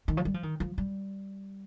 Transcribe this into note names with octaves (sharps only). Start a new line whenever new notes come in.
D#3
F3
G3
F3
D#3
F3
G3